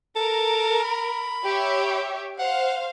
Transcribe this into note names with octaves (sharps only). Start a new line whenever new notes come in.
A4 A#4
B5
G4 C#5 E5
C5 F5 F#5